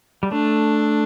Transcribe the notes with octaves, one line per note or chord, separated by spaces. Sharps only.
G3
A3 D4